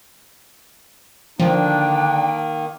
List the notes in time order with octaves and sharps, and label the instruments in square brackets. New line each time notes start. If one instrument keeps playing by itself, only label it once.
[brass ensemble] D3 D4 [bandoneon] D#3 A#3 [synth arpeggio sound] F3 [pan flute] G5